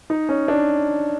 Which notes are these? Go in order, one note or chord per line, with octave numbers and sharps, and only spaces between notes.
D#4
C#4
D4